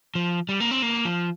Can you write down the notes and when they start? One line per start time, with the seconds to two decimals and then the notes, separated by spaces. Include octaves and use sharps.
0.15 F3
0.49 G3
0.60 A#3
0.71 C4
0.82 A#3
1.05 F3